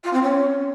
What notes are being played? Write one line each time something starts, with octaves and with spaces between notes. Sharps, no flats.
F4
C4
C#4